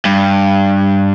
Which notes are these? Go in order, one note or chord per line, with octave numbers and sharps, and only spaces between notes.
G2